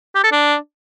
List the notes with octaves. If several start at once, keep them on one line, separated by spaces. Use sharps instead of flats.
G4
A4
D4